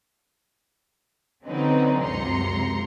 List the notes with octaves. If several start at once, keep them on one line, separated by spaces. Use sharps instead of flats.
D3 F#3 C4 C#4 D#4 B4
C#2 F#2 C3 A#5 C6 C#7